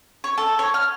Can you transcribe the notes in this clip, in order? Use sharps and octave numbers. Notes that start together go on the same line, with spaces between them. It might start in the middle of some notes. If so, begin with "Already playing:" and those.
C#5
A4
C#5
F6